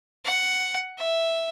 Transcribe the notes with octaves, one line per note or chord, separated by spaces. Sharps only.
F#5
E5